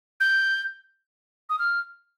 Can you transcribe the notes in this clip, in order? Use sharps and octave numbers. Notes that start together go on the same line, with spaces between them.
G6
D#6
F6